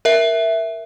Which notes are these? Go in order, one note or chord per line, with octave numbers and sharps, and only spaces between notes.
A#4 E5